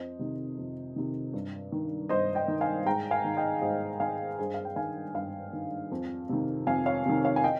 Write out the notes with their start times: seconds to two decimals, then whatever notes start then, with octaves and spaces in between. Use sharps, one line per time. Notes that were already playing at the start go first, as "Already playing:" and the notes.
Already playing: F2 C5 D#5
0.19 C3 D#3
0.58 F2
0.96 C3 D#3
1.33 G2
1.72 D#3
2.09 G2 C5 D#5
2.35 D#5 G5
2.48 D#3
2.61 F5 G#5
2.86 G#2 G5 A#5
3.11 F5 G#5
3.24 D#3
3.37 D#5 G5
3.62 G#2 C5 D#5
4.00 D#3 F5 G#5
4.39 G2 G#4 C5
4.54 F5
4.65 G5
4.76 D#3 F5 G#5
5.14 G2 F5 G#5
5.53 D#3
5.91 F2
6.29 C3 D#3
6.67 F2 F5 G#5
6.86 C#5 F5
7.06 C3 D#3
7.24 C#5 F5
7.36 G#5
7.44 D#5 G5